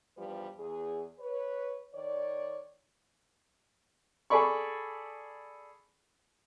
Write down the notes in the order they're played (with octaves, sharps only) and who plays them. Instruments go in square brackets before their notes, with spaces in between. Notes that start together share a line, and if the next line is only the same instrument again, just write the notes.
[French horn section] E2 G2 F3 G3 B4
E2 G#4
B4 C#5
D#3 C#5 D5
[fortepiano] G#4 A4 D5 B5 C#6